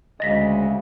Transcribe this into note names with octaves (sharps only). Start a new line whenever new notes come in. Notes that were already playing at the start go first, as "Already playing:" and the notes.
D2 C#3 G#3 D#5 A#6 B6